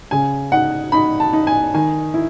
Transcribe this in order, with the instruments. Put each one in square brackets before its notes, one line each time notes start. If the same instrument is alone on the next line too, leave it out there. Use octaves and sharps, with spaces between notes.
[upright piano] C#3 G#5
D#4 F#5
D#4 B5
A5
D#4
G#5
D#3 G#5
E4